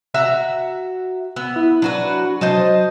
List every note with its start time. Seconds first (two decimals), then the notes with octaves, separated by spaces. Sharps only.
0.14 F#4 E5 A#5
1.36 B3 E6
1.56 E4
1.82 F#3 D4 F#4 B4
2.41 F#3 C5 D#5 A5